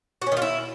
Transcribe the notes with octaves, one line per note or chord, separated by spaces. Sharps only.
F#4
C#4
D#3
F4
E4